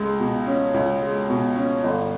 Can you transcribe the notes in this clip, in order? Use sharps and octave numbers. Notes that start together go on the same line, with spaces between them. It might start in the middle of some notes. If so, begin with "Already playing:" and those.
Already playing: C#2 G#3
B2
C#4
C#2
G#3
B2
C#4
G1